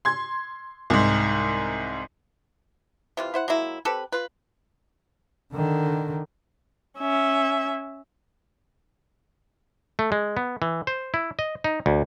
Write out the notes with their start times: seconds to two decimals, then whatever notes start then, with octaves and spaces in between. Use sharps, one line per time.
0.05 C6 G#6
0.90 C2 G#2
3.17 C3 E3 F4
3.34 E4 C5 F#5
3.48 F#3 G#3 A#3 E4
3.85 C4 G4 A4 B4
4.12 F4 B4
5.53 D3 D#3
6.99 C#4 E5
9.99 A3
10.12 G#3
10.37 B3
10.62 E3
10.87 C5
11.14 E4
11.39 D#5
11.64 D#4
11.86 D2